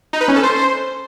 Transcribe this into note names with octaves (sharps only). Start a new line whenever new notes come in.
D#4
B4
C#4
A4
C5